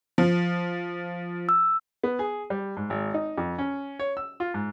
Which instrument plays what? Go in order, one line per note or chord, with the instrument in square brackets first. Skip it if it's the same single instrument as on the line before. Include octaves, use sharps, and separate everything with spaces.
[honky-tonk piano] F3
[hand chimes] E6
[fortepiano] B3
G#4
G3
G#2
G#1
D#4
F2
C#4
C#5
E6
F4
G#2